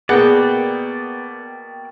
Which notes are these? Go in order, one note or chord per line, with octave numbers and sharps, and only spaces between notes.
B2 A#3 B3 G#4 A#4 D5 F#5 G5